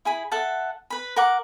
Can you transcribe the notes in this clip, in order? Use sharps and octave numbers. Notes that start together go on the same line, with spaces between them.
E4 G#4 B5
A4 E5 F#5 A5
B4 B5
A#4 F#5 D6